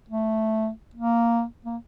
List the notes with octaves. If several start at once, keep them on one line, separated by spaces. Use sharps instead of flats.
A3
A#3
A#3